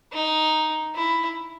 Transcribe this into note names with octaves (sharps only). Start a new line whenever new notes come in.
D#4
E4